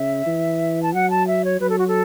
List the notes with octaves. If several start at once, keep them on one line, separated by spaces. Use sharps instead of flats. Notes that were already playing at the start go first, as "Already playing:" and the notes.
Already playing: C#3 E5
E3
A5
F#3 F#5
A5
E5
C#5
F#3 B4
A4
F#4
A4